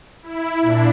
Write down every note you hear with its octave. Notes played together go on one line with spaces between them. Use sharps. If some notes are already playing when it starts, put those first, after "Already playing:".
E4
A#2 D4